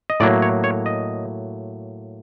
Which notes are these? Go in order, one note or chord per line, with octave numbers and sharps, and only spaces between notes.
D#5
A2 F#3 A#3 D5
C#5
C#5
D#5